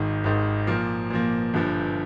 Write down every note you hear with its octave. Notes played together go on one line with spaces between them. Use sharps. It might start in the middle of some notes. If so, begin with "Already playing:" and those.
Already playing: G#1 G#2 D#3
G#1 G#2 D#3
A#2 F3 A#3
A#2 F3 A#3
G1 G2 F3